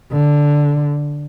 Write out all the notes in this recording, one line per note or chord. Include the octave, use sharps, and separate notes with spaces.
D3